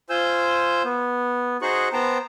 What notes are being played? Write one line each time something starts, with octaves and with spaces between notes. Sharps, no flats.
F4 C5 G#5 E6 G6
B3
D#4 F#4 G#4 C5 C#6 F#6
B3 C5 G5 A5 A#5